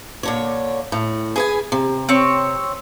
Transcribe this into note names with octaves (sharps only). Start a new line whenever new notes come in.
A#2 D3 C#5
A2
G#4 B4 G#5
C3
C4 C#5